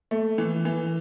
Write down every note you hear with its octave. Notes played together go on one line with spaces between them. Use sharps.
A3
E3
E3